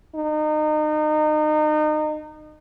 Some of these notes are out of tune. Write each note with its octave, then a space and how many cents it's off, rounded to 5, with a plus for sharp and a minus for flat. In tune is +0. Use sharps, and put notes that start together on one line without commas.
D#4 -30